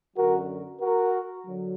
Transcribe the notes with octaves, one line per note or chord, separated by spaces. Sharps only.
F#2 D3 F#3 F#4 A#4
F#4 A#4
D3 F#3